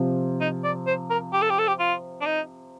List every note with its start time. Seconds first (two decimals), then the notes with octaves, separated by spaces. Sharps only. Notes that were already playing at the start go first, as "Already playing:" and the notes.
Already playing: C3 F3 C4
0.41 D#4
0.64 D5
0.87 C5
1.10 A#4
1.33 G4
1.42 A4
1.50 G4
1.59 A4
1.68 G4
1.80 F4
2.21 D4
2.26 D#4